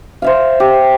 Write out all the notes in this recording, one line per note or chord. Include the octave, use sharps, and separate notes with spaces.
C5 E5 F5
G4